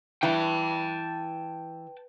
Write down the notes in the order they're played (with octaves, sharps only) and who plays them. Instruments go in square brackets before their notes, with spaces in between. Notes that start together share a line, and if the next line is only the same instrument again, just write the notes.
[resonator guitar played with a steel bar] E3 [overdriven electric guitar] G5 A5